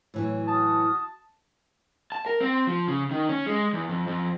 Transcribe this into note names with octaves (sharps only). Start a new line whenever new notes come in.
A2 E3 F#3
F#4 A5 D#6 F6
A5
A#4
C4
F3
C#3
D#3
C#4
G#3
E2
F2
F2